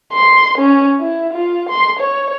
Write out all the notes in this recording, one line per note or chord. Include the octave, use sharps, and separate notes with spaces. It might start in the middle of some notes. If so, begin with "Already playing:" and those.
C6
C#4
E4
F4
C6
C#5